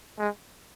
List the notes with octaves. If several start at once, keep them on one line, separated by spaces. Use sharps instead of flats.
G#3